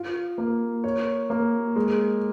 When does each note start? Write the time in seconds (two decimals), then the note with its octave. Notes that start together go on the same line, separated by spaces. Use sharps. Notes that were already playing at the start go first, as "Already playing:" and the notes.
Already playing: F4
0.38 A#3
0.84 C#5
1.30 A#3
1.76 G#3